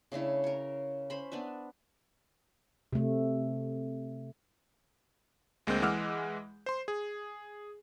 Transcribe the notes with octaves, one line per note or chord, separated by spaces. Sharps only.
C#3 A3 D4 E4
A#4 C#5
C#4 C5 B5
B3 D4 B4 E5
C3 A3
D2 G#3 A#3 C4 G6
E3 G#3 F#5 D6 E6 F6
C5 C6
G#4